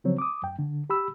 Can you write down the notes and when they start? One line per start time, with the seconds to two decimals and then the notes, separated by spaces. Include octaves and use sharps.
0.04 C#3 F3 F#3 C4 C#5
0.18 D6 D#6
0.43 F#2 G5
0.59 D3
0.90 G4 B5 E6